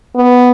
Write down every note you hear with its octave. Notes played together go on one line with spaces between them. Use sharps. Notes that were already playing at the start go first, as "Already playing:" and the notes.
B3